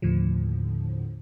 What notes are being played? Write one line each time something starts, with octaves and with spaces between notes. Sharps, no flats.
D#2 A2 D3 F3